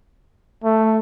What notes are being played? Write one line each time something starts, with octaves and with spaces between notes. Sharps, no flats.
A3